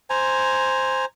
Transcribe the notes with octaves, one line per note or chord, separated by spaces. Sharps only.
C5 G#5 A#5